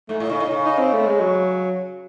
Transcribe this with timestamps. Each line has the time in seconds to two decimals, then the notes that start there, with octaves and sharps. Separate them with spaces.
0.09 G#2 A3
0.20 A2
0.30 C#3 D#4
0.40 A2
0.51 C#3
0.65 D#4
0.79 C4
0.93 A3
1.06 G#3
1.20 F#3